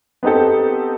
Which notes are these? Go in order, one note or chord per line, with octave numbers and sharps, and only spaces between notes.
B3 C4 D#4 G4 A4